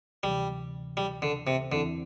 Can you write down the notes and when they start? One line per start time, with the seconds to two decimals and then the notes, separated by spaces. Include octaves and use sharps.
0.23 D2 C3 E3 G3
0.97 G3
1.22 D3
1.47 C3
1.72 E2 D3 E3 C4 E4